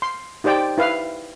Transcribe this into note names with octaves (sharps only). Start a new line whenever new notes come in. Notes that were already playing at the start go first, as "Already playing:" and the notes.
C6
D#4 G4 C5 D5 G5
E4 B4 F5